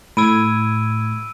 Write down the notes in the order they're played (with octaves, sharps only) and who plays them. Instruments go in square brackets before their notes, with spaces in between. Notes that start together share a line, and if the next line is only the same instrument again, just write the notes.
[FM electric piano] A2 G#6 [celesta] B5 [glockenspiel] E6 D7 D#7